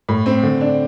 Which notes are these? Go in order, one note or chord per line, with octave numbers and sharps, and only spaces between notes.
A2
C4
D3
D4